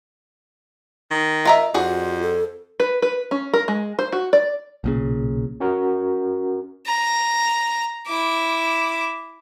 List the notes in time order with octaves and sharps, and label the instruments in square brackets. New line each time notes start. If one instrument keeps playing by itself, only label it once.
[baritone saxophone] D#3
[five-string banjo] F4 A#4 E5 [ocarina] D#5
[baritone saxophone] F2 [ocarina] F4 [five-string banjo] F#4 G#4 D5
[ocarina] A4
[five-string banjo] B4
B4
C#4
A#4
G#3
C5
F#4
D5
[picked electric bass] B1 A#2 C#3
[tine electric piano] C#4 F#4 A#4
[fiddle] A#5
E4 D6